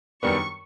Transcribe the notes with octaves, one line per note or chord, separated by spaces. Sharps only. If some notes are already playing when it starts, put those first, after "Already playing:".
F#2 D#3 G3 B3 D4 C#6